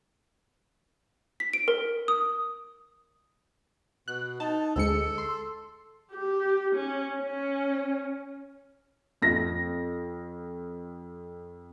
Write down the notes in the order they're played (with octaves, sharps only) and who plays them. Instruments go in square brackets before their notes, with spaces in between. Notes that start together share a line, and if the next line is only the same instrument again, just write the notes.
[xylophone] B6
D7
A#4
D#6
[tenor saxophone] B2 [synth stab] F#6
[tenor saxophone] D#4 [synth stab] A5
[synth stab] D2 G#3 C#7 [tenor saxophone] A4
[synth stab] C6
[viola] G4
C#4
C#4
[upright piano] F2 A#6